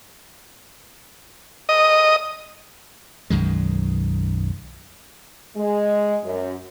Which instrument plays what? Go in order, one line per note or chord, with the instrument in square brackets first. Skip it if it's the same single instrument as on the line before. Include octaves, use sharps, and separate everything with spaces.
[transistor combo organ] D#5
[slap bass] B1 F#2 D#3 G#3
[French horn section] G#3
F#2